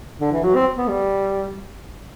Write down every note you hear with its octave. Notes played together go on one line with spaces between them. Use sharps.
D3
E3
F#3
C4
B3
G3